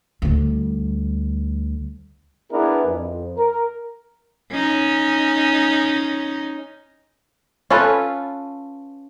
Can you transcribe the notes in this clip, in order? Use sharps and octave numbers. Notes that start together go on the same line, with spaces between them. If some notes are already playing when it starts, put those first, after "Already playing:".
D2 G3
B3 D4 E4 G#4 A#4 B4
F2
A#4
C#4 D#4
C#4 F4 A4 B4